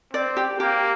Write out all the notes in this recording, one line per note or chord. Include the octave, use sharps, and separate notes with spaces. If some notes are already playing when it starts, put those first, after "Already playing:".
C4 D5
G4
A#3 G4